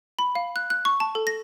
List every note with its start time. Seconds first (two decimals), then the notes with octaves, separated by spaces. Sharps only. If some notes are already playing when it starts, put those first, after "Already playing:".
0.19 B5
0.35 F5
0.56 F#6
0.70 F#6
0.85 C#6
1.00 A5
1.15 A4
1.27 A#6